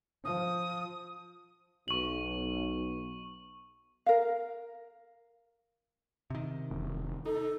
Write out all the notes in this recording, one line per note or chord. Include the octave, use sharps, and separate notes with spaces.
F3 D#6
B1 C#6 F#7
A#4 F5
C3 D#3
E1
D#4 A4